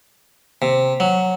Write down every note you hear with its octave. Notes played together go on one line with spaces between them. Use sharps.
C3
F#3